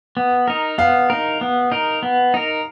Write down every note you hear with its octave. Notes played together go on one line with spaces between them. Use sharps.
B3
D#4 A#4
B3 F5
D#4 A#4
B3
D#4 A#4
B3
D#4 A#4